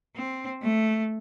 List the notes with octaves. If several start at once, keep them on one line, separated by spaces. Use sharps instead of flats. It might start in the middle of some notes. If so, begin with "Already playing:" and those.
C4
A3